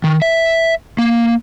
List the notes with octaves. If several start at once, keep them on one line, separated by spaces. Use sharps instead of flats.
D#3
E5
A#3